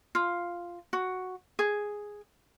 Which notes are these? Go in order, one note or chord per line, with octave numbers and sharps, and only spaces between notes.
F4
F#4
G#4